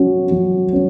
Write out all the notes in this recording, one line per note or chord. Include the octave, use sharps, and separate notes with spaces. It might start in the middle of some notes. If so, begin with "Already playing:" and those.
Already playing: F#3 C#4 F#4
F#3
C#4